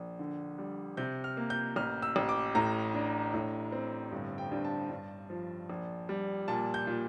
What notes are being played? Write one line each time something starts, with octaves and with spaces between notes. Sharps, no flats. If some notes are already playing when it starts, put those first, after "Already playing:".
Already playing: A#1
D3
G3
C3 G6
F6
A#3
G6
A1 F6
E6
A1
D6
A2 A#5
D4
A2
C4
G1
G5
G2
A5
G2
F3
A#1
G3
A#2 A5
G6
A#2